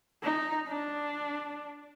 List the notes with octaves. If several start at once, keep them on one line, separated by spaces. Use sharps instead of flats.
D#4
D4